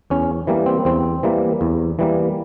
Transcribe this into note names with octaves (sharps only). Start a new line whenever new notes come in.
E2 C#4
E3 G3 A#3
C4
E2 C4
E3 G3 A#3
E2
E3 G3 A#3